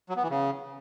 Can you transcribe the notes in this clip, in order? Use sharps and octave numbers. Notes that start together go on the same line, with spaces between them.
F#3
B3
E3
C#3